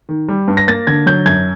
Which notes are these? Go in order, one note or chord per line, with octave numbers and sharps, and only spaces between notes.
D#3
G3
G2
A#6
A#3 A6
D3 G#6
F#3 G6
F#2 G#6